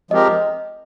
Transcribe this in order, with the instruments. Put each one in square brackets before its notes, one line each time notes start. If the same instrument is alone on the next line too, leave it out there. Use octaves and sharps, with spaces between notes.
[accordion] F3 G#3 C4 G4 A#4 [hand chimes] D#5